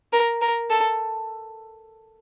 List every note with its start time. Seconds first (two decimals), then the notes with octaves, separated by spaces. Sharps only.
0.13 A#4
0.41 A#4
0.70 A4